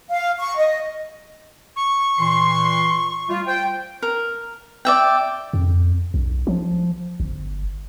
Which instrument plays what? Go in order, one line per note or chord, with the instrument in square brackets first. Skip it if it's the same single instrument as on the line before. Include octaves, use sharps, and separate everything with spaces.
[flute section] F5
C#6
D#5
[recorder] C#6
[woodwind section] A#2 E3 C6
G3 A3 F4
C5 G5
[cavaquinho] A#4
D5 E5 G5
[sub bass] F2
B1
F3
G1